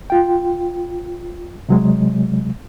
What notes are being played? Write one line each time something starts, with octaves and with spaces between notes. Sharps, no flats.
F4 G5
C3 F#3 G#3